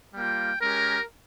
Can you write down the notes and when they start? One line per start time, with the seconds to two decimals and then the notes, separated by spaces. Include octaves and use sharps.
0.14 G3 A#3 F4 G5
0.60 G#3 C#4 G4 A#4